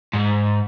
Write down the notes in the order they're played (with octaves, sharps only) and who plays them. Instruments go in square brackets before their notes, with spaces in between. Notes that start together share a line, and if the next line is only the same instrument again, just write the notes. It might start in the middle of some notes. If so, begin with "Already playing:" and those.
[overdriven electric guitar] G#2